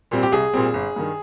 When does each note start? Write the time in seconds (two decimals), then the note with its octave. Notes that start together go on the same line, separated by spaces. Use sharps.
0.11 A#2 G3 C4
0.23 G4
0.32 C2 G#4
0.53 A#2 G3 C4
0.74 G1
0.96 G2 D#3